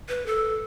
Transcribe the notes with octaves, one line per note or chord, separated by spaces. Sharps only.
B4
A4